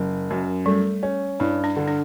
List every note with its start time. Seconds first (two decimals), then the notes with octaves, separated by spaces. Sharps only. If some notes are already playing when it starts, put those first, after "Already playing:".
Already playing: F#1 F#3
0.30 F#2
0.66 G3 A3
1.03 C#4
1.40 G2 E4
1.64 D4
1.76 D3
1.88 D4